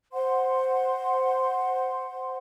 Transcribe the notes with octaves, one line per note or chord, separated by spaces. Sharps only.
C5 F#5 C6